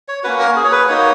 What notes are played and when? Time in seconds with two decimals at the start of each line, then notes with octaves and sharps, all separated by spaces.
0.08 C#5
0.24 A#3 C#4 F#4 B4
0.40 A#4
0.56 G#4
0.65 C#5
0.72 B4
0.88 A#3 D#4 F#4 C#5